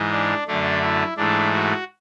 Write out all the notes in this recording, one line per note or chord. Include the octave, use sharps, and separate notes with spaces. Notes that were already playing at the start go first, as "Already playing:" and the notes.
Already playing: G#2 E3 G#3
D4
F#2 D3 A3 D4
E4
G#2 E3 A3 D4
F#4